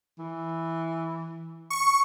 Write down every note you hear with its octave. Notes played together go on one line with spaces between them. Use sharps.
E3
C#6